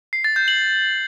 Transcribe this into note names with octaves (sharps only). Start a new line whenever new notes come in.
C7
A6
G6
F#7